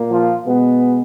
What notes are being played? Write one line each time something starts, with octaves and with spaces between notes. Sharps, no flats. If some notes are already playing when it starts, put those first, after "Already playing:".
Already playing: A#2 A#3
F3 F4
B2 G#3 B3